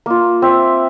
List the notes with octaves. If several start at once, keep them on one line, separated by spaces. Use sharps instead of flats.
A#3 F4
C4 E5